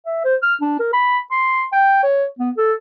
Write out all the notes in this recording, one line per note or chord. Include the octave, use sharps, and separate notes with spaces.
E5
C5
F6
D4
A#4
B5
C6
G5
C#5
B3
A4